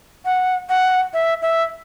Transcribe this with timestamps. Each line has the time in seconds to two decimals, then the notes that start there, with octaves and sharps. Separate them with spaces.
0.25 F#5
0.69 F#5
1.13 E5
1.42 E5